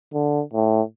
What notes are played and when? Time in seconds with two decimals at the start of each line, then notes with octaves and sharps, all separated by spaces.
0.13 D3
0.54 A2